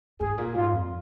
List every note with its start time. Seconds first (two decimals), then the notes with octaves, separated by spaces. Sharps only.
0.19 G#2 G#4
0.38 A#2
0.54 G#2 F4
0.72 F2